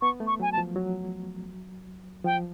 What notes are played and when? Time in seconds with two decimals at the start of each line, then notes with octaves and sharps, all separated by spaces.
0.01 B3 C#6
0.20 A3
0.27 C#6
0.40 F#3 G#5
0.52 A5
0.58 F3
0.76 F#3
2.25 F3 G5